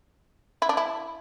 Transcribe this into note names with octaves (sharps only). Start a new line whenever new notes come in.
E4
D4
E4